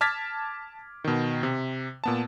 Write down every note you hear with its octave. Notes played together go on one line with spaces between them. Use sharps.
A5 D6 F6 G#6 A6 B6
B2 D#3
C3
A#2 B3 A5